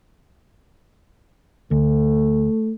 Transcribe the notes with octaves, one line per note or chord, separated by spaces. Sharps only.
D2 A3